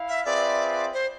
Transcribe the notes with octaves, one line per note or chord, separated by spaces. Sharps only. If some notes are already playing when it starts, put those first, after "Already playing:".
Already playing: E4 F5
E5
C4 F4 G#4 B4 D5 E5
C5